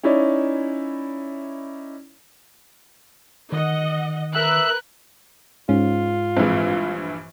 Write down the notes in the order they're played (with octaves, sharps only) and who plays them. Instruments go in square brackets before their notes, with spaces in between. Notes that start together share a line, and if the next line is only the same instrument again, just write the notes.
[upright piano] C#4 D#4 E4 C#5 D5
[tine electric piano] D#3 [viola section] D#5 F#5
[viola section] A#4 B4 [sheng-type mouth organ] E5 E6 [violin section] F#6
[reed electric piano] G#2 [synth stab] C#4 [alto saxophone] F4
[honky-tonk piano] A#1 G2 E3 [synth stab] G#3 C4